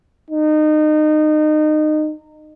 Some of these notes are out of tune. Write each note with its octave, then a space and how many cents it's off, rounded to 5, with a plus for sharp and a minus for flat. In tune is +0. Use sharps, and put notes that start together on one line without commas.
D#4 -25